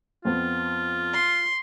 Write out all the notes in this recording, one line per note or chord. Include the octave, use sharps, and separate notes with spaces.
F2 B3 C4 F4
C6